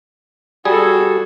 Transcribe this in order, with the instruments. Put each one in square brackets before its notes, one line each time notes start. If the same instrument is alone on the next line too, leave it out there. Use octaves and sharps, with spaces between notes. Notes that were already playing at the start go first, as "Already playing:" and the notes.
[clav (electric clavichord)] G3 G#4 [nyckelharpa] F#4 A4